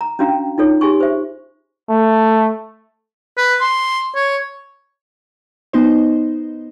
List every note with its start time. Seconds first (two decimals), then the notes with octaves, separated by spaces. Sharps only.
0.01 A#5
0.19 C#4 D4 F#4 F5 G5 A#5
0.58 D#4 F4 A4 C#5
0.81 G4 G#4 G#5 C6 C#6
1.01 C5 E5
1.89 A3
3.37 B4
3.61 C6
4.15 C#5
5.73 B3 D#4 C5